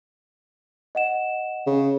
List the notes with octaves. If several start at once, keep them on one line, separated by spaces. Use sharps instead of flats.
D#5 F#5 E7
C#3